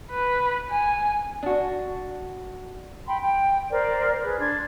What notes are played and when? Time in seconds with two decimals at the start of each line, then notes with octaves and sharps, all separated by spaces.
0.11 B4
0.71 G#5
1.43 D4 F#4
3.06 G5 B5 C6
3.22 G5
3.70 A#4 C5 D5
4.10 C5
4.22 G#4 B4
4.39 D4 C6 G#6